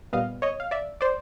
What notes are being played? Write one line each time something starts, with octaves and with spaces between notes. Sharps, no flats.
A#2 G3 B3 D#5 F5
C#5 D#5
F5
D5 E5
C5 D5